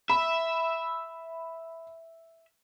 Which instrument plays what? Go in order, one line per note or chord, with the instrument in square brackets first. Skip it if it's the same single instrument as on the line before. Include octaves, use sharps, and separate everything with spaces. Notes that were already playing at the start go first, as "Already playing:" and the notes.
[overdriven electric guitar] E5 [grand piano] B5